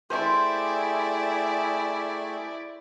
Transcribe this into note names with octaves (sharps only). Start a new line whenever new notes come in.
A3 E4 G4 G#4 C5 D5 C6